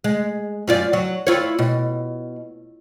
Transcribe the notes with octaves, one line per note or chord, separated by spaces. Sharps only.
G#3
F#2 F4 D5
F#3
E4 F4 C#5
B2